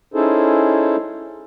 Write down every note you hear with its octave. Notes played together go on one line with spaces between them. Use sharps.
C#4 D#4 E4 G#4 A4 C5